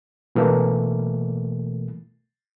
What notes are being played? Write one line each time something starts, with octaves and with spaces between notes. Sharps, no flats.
B2 E3 A3 A#3